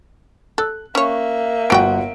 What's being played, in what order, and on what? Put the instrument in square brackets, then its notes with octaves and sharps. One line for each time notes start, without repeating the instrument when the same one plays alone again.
[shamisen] A4 [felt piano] F#6
[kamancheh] A#3 E5 [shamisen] C#4 C#5
[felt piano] G1 F#5 D7 [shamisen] F3 F#4 G5